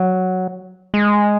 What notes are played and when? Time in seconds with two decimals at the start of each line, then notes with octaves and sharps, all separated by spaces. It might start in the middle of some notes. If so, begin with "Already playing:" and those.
Already playing: F#3
0.94 G#3